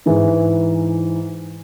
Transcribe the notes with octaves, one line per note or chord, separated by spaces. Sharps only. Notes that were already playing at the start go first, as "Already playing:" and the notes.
G#2 E3 G#3